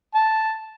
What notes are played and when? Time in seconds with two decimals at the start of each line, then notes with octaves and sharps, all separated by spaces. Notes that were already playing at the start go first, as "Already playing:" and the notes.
0.14 A5